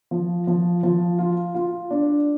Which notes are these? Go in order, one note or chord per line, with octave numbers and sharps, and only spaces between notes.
F3
F3
F3
F4
F4
D4